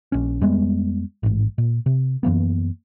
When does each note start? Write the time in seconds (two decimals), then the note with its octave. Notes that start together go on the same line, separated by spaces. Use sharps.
0.12 A#1 C#4
0.41 F2 G3 G#3 B3
1.23 A1 G#2
1.58 A#2
1.86 C3
2.23 F#2 E3 A#3 B3